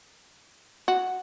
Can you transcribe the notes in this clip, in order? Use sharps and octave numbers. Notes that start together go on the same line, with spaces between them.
F#4